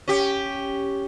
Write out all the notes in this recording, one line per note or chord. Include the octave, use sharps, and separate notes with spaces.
C#4 G4